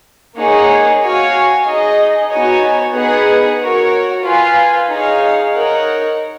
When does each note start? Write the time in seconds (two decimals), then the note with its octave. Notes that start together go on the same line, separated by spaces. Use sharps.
0.37 A#3 D#4 G#4 C#5 F#5
1.02 F#4 C#5 F5 G#5
1.66 D#4 G#4 D#5
2.31 B3 D#4 F#4 C#5 G#5
2.94 B3 D#4 G#4 B4 F#5
3.59 F#4 A#4 C#5
4.24 F4 B4 F5 G#5
4.89 D#4 G#4 C#5 F5
5.53 D#4 A#4 C#5 F#5